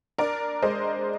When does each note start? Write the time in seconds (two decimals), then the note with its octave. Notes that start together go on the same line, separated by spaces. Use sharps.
0.18 D4 A#4 D5
0.62 G#3 C5 D#5